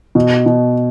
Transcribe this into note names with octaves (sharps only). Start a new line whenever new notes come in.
B2
B2